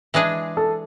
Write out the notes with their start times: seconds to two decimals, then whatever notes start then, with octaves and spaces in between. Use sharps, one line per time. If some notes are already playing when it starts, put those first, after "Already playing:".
0.14 E3 G#3 D4 G#4
0.57 A4